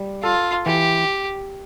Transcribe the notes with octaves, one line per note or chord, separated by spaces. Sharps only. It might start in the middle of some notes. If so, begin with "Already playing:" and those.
Already playing: G3
F4 A4
E3 G4